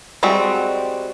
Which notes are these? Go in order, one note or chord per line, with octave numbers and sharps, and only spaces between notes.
G3 G#3 C4 F#4